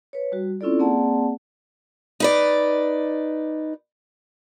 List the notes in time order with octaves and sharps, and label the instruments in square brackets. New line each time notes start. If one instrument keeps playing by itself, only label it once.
[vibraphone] B4 C#5
G3 F#4
C4 C#4 E4 F4 A4 D5
A#3 C4 G#4 D5 F#5 A5
[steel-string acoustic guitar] D#4 B4 D5